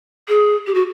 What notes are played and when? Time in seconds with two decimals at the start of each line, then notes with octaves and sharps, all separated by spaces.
0.28 G#4
0.67 G4
0.74 F#4